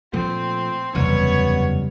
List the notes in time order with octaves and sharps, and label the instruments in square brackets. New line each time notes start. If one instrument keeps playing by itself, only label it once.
[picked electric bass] A#2 F3 A3 [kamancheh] C4
[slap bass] F#1 C3 G3 [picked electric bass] E2 [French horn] B3 [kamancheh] C#5